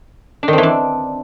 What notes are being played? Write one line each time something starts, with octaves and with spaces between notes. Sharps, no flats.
D4
D#3
C4
E3
D4